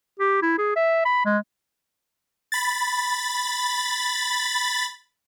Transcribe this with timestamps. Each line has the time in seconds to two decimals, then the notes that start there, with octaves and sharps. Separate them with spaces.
0.19 G4
0.42 E4
0.58 G#4
0.76 E5
1.05 B5
1.25 G#3
2.52 B5 A6